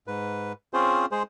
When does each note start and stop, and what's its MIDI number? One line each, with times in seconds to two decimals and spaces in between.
0.07 0.53 44
0.07 0.53 71
0.73 1.06 60
0.73 1.06 61
0.73 1.06 65
0.73 1.06 68
0.73 1.06 72
1.11 1.23 56
1.11 1.23 68
1.11 1.23 72